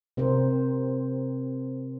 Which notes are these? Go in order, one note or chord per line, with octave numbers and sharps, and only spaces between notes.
C3 C4 A#4 C5